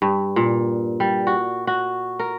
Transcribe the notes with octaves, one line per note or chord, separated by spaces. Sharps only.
G2
A#2
G3
F#4
F#4
A#4